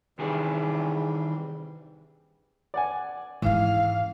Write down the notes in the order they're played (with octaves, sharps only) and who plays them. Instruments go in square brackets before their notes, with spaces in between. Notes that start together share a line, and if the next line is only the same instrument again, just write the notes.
[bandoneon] C3 E3 G3 [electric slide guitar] D#3 D4 G#4
[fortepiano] D5 F#5 G#5
[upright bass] G#2 C#4 [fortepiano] E3 [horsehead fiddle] F5